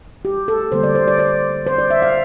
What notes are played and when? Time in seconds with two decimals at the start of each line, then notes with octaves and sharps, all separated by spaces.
0.25 G4
0.48 A4
0.72 D3 G3 A#3 C5
0.83 D5
0.95 C5
1.08 D5
1.19 D5
1.67 C5
1.78 D5
1.91 E5
2.02 F5